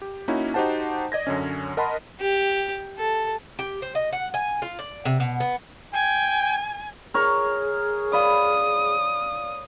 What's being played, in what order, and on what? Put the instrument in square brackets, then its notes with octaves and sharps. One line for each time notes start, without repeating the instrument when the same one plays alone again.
[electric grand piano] G4
A#3 C#4 D#4 E4 F#4
D#4 F#4 G4 C5 F#5 A5
D5 D#5 G#6 A#6
F#2 D3 C#4
A#4 D#5 F#5 A5 B5 C6
[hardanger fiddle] G4
A4
[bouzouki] G4
C5
D#5
F#5
G#5
F4
D5
C3
B2
B3
[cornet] G5 [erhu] G#5
[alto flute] G#4 [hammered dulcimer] A#4 C#5
[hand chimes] D5 F5 [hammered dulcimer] B5 [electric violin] D#6